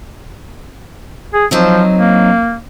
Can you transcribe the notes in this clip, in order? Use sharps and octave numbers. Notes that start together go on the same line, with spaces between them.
G#4
F3 F#3 C4 D#4
A#3